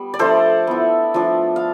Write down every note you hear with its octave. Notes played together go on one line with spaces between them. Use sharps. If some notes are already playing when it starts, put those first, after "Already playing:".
Already playing: G3 B3
D5
F3 A3 D4 F4 A4 C5
B3 E4
F3 A3 D4
F5